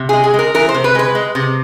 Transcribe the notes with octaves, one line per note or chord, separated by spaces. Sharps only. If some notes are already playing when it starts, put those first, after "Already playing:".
Already playing: C3
G#3 G#4
G#4
G#3 A#4
E3 A#4
C5
C3
B4
G#3 B4
G#3
C3